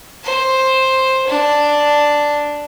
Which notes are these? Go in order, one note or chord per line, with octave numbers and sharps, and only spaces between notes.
C5
D4